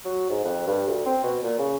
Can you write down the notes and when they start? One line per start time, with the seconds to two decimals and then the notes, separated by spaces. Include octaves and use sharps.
0.05 F#3
0.30 G#2
0.44 F2
0.67 G2
0.88 D2
1.05 C4
1.24 B2
1.43 A#2
1.59 C#3